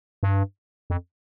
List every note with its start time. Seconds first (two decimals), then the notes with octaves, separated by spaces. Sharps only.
0.23 G2
0.90 F2